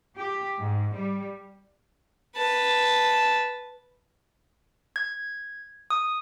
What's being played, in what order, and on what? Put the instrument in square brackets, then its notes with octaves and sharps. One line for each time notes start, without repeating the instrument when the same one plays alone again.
[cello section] G4
G#2
G3
[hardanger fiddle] B4 A5
[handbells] G#6
D#6